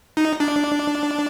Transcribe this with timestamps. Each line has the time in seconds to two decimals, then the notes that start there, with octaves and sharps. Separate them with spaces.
0.17 D#4
0.40 D4